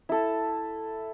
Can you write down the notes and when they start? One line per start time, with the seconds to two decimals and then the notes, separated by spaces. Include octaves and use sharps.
0.09 E4 A4